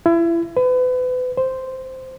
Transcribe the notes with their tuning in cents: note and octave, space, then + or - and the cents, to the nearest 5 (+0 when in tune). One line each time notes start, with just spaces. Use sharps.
E4 +30
B4 +35
C5 -5